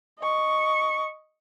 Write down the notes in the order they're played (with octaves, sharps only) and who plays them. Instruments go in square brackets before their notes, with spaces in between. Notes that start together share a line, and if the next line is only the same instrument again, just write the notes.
[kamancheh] D#5 C#6